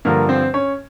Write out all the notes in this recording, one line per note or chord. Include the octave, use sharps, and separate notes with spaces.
G2 D3 F3 A#3 A#4
C4 C5
C#4 C#5